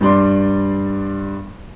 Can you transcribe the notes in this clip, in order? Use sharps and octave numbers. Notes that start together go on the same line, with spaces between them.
G2 G3 D5 C6